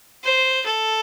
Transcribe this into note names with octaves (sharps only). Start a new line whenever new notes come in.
C5
A4